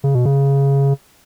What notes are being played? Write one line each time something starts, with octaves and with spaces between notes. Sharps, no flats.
C#3
B2
C#3